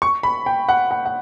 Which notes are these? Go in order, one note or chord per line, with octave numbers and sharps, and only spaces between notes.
C#6
B5
G5
F#5
F#5
F#5